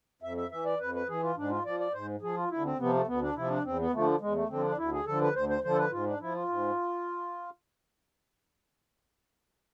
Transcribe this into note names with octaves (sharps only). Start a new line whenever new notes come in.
F2 E5
E5
E3 E5
D5
F2 B4
B4
E3 G#4
F4
G#2 D4
F4
F3 D5
D5
G#2 C5
F3 G#4
F4
D2 E4
C4
C3 F3 B3
A3
D2 B3
D4
C3 F3 E4
D4
E2 C4
B3
D3 F3 A3
E2 G#3
A3
D3 F3 C4
D4
D2 E4
G#4
D3 F3 A4
B4
D2 C5
C5
D3 F3 C5
A4
B4
G#2 F4
D4
F3 E4
F4
G#2